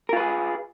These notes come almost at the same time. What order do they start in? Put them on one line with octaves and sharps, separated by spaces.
A#4 F4 B4 G#4